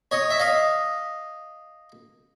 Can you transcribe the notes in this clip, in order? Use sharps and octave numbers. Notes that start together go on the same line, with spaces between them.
C#5 D#5
E5
D#5 F5